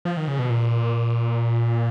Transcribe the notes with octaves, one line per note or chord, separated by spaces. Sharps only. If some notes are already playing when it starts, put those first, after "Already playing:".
F3
D#3
C#3
B2
A#2